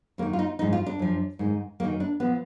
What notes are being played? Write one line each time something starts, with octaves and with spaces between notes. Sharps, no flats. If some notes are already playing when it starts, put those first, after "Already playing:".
F#2 D#3 A#3
F4
D#4
G#2 F3 D#4
F4
D4
F#2 F3
G#2 D#3
F#2 D#3 A#3
D4
A#2 F3 B3